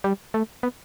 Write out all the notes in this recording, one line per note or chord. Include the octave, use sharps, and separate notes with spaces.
G3
A3
B3